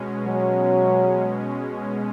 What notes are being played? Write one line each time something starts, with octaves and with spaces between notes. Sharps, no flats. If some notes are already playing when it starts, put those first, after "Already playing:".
Already playing: B2 G#3 C#4
F#3